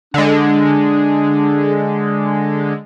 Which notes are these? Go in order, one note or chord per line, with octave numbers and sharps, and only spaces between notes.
D3 G#3 D4